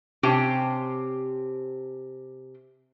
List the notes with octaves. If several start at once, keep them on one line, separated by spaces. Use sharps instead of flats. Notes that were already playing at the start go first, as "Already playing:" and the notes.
C3 C#4 G4 C5 G5 A5